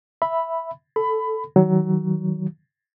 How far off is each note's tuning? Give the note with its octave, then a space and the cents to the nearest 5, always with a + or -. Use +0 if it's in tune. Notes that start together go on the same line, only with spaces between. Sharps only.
E5 +0 B5 +0
A4 +0 B5 +20
D#3 +30 F#3 +20